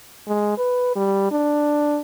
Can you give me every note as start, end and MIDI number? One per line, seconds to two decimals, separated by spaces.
0.27 0.57 56
0.58 0.91 71
0.96 1.31 55
1.31 1.99 62